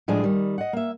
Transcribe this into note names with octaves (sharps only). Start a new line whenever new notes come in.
A2 F3 G#3 D4 G#4
D#3 G3
D#5 F#5
A#3 E5